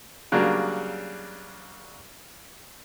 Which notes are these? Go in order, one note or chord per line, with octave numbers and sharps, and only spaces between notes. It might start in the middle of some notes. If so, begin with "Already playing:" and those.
C#3 F#3 G3 A#3 D4